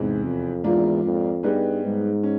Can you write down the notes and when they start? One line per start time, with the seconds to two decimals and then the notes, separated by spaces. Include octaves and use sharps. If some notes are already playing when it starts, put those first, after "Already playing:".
Already playing: E2 G#2 C3 E3
0.24 F2
0.64 E2 G#2 F3 A#3 D4 F4
1.04 F2
1.43 G2 G3 B3 D#4 G#4 B4
1.84 G#2
2.23 C#4